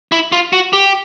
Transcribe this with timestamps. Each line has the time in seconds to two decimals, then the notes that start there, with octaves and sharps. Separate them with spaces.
0.12 E4
0.32 F4
0.53 F#4
0.73 G4